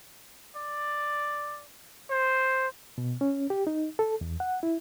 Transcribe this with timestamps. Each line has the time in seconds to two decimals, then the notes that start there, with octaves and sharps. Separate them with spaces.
0.56 D5
2.10 C5
2.98 B2
3.21 C#4
3.50 G4
3.67 D#4
3.99 A4
4.21 E2
4.40 F#5
4.63 E4